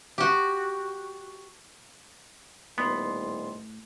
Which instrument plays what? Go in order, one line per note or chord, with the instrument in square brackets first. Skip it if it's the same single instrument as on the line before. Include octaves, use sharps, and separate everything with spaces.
[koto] F#4 G4
[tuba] D#1 [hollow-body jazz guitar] A2 D5 [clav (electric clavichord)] B3 [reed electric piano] C6